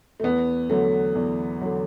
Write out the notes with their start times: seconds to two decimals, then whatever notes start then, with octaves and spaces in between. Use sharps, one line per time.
0.20 A3
0.23 E2 B3
0.70 D3 F#3 A3
1.15 E2
1.61 D3 F#3